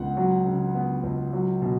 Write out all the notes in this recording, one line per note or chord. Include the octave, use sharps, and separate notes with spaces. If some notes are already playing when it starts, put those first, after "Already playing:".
Already playing: C#2 B3 F#5
F#3
C#3
B3
C#2
F#3
B2